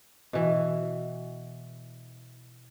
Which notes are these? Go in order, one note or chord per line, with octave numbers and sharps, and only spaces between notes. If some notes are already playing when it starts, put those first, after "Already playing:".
B2 E3